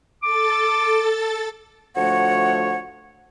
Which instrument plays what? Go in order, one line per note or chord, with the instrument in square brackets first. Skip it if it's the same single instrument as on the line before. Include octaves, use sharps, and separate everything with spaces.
[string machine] A4 A6 [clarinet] D6
[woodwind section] D2 F3 A3 C#5 F#5